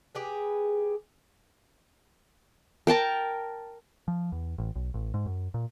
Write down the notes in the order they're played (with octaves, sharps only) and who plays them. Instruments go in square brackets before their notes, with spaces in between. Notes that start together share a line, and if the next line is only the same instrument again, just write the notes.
[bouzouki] G4 G#4 B4
[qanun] A#4 G5 A5 A#5
[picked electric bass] F3
E2
A1
B1
A1
G#2
F#2
A#2